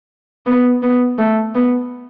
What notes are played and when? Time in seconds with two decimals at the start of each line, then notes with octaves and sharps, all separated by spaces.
0.46 B3
0.82 B3
1.18 A3
1.54 B3